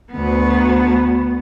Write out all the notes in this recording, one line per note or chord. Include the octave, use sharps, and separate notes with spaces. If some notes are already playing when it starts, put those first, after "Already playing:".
D2 B3